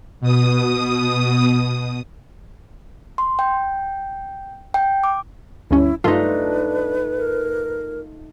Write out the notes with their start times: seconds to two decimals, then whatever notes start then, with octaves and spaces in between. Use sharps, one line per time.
0.21 B2 D#6
3.18 C6
3.39 G5
4.74 G5
5.04 D6
5.71 D2 G2 C#4 E4
6.04 G2 A3 D4 D#4 F4 B4
7.18 A#4